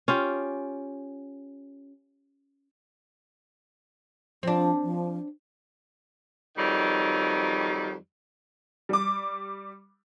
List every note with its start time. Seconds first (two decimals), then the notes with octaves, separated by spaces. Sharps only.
0.08 C#4 F4 G4
4.43 F3 C4 D4
4.83 F3
6.58 F2 D#3 F#3 G3
8.89 G3 D6